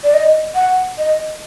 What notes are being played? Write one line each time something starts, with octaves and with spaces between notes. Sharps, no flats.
D5
D#5
F#5
D#5